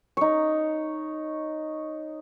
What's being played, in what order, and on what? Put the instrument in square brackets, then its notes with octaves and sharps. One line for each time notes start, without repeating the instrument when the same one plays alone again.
[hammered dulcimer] D#4 C#5